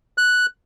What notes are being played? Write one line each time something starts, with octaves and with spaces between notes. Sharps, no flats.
F#6